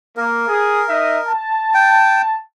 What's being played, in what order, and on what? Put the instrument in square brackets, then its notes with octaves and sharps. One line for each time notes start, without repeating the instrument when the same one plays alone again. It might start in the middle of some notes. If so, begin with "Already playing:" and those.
[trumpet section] A#3 [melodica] A#4
[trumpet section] G#4
D#4 D#5 E5
A5
[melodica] G5